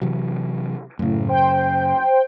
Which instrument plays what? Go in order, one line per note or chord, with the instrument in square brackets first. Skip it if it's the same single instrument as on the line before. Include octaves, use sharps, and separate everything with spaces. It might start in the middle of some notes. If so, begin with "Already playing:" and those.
[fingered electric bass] C3 E3 F#3
[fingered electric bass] F#2 C#3 [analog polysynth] A2
[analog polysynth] C5 G5